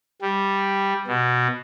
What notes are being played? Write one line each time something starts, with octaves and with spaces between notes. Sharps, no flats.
G3
B2